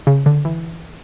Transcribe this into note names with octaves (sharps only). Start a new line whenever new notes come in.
C#3
D3
E3